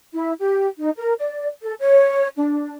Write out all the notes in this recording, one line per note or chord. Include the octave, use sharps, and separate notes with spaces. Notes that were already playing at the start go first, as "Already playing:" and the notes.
E4
G4
D#4
A#4
D5
A4
C#5
D4